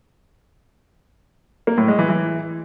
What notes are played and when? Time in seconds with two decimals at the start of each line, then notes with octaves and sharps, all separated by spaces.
1.67 A#3
1.78 A2
1.88 G#3
1.99 E3
2.09 E3